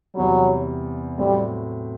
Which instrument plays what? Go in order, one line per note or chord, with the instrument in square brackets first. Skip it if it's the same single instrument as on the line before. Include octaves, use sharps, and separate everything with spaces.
[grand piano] E2 C3 G3 [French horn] F#3
[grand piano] A2 F#3 A3 C4 [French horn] G3